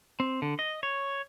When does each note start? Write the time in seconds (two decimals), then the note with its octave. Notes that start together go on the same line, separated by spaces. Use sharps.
0.20 C4
0.42 D3
0.59 D#5
0.83 C#5